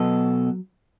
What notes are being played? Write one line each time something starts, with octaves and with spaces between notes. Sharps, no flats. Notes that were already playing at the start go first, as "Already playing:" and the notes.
Already playing: B2 F#3 B3 A4